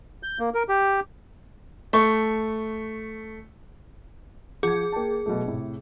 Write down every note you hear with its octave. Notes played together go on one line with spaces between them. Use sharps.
G6
A#3
A#4
G4
A3 C#6
F3 G#4 G#6
A#3 G5 A5
B2 F#3 A3
A2 C3